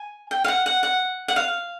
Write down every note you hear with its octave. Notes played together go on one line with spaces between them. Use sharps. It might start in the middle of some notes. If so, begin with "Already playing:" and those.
Already playing: G#5
G5
F5
F#5
F#5
F#5
F#5
F5